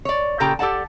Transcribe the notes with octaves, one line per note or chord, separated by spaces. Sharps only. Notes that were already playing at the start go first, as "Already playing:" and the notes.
C#5 D5
A#2 C#3 G4 A4 G5 A#5
G4 A4 D5 F#5 A5